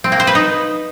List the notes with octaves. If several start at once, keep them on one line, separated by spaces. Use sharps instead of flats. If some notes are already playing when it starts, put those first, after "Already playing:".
C4
A#3
C5
B4
D#4